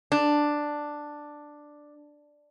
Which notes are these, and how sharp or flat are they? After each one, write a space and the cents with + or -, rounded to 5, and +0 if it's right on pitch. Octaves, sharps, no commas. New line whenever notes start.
D4 +5